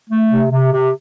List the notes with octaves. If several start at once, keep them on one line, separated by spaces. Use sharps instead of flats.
A3
C3
C3
C3